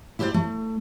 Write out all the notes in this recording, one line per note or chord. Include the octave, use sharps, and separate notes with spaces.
E4 G4 G#4 B4 C5 D5
A3